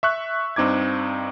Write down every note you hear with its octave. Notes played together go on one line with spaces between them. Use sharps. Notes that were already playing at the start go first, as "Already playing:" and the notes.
E5 C#6 F#6
G2 C4 D#4 D6 G#6